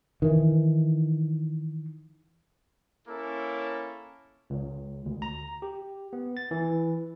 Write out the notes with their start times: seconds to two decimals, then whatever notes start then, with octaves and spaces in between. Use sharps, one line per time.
0.22 D#3 E3
3.08 A#3 C#4 E4 A4
4.50 C#2
5.05 D2
5.22 A#5
5.62 G4
6.13 B3
6.37 A6
6.51 E3